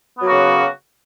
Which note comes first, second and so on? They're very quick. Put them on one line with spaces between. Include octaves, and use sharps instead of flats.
B3 F#3 A#3 F#4 C#3